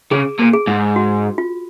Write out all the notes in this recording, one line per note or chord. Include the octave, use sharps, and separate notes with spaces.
C#3 G#4
A#2
G#4
G#2
F#4
F4